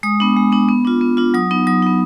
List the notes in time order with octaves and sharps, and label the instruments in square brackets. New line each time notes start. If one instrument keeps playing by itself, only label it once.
[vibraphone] G#3 D#6
B3 D4
G#3
B3 D4
B3
D4 F4
B3
D4 F4
F#3 D#6
B3 D#4
F#3 D#6
B3 D#4